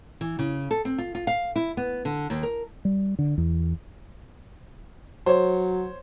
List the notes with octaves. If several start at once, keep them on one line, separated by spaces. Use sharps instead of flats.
E3
C#3
A4
C4
F4
F4
F5
E4
B3
D3
D#2
A#4
G3
D3
E2
F#3 C5 C#5